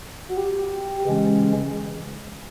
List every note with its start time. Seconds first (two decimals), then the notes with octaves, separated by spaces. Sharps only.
0.29 F#4
0.37 G4
1.05 C#3 E3 G#3 C#4